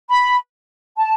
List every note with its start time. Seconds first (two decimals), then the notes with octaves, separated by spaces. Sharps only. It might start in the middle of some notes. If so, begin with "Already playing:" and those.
0.10 B5
0.97 A5